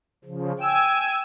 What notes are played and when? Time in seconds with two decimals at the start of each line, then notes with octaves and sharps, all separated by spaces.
0.25 C#3 F3
0.61 G5 G#5 E6